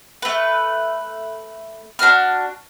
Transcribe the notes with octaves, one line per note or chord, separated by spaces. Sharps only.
A3 B4
D4 F#4 B4 F6